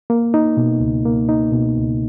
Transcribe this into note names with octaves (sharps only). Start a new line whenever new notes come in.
A#3
D#4
B2
C#2
A#3
D#4
B2
C#2